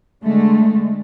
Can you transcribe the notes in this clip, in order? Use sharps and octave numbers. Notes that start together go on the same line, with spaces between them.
D3 G#3 A3